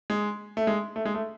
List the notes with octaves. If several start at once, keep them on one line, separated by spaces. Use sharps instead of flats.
G#3
A3
G#3
A3
G#3
A3